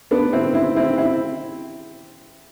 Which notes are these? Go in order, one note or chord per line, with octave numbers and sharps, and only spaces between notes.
B3 D4
C4 E4
C4 E4
C4 E4
C4 E4